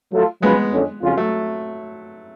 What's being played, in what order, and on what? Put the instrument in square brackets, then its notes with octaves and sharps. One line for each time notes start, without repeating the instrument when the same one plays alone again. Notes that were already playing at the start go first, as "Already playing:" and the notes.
[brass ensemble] F#3 A3 F4 A4
[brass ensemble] F#3 C#4 F4 G#4 B4 [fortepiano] G#3 B3
[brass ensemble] F2 D3 G#3 C#4
F2 C#3 F#3 C#4 F4
[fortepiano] F#3 A3